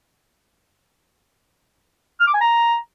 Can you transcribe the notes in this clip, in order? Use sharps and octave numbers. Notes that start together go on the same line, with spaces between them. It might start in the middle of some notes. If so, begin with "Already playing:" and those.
F6
D6
G#5
A#5